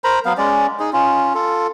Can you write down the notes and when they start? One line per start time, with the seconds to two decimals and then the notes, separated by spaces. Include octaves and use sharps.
0.04 A#4 C5 A#5 B5
0.25 F#3 B3 F5
0.38 G#3 C#4 D5
0.79 D#4 G#4
0.93 C#4 F4
1.35 F4 A4